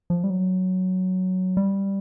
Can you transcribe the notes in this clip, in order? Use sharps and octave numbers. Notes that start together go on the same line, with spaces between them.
F3
G3
F#3
G3